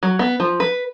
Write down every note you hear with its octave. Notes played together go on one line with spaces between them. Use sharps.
F#3
B3
F3
B4